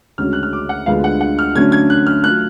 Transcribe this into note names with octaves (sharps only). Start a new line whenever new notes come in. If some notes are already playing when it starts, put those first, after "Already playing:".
D2 C#3 G#3 C#4 F#4 F6
F#6
F6
D6
F#5
D2 D3 G#3 B3 F4 F5
F#5
F#5
F6
D3 F#3 A3 C#4 G#6
G#6
F#6
F6
F#3 A3 F4 F#6